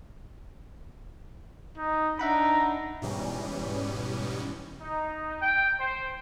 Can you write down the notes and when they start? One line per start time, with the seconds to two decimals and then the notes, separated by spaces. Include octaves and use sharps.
1.77 D#4
2.19 D4 D#4 E5 F#5 A#5 B5
3.02 G#2 B2 E3 G3 C#4
4.80 D#4
5.42 G5
5.79 C5